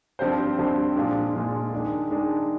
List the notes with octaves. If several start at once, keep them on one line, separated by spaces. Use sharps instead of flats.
G2 F3 C4 G4 C5
G2 F3 C4 G4 C5
A#2 F3 G#3 D4 F4
A#2 F3 G#3 D4 F4
D#3 G#3 D4
D#3 G#3 D4